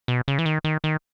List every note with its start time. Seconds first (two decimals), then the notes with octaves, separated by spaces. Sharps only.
0.08 B2
0.28 C#3
0.39 E3
0.46 D#3
0.64 D#3
0.84 D#3